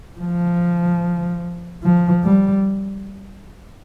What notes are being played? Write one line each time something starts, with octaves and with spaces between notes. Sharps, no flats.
F3
F3
G3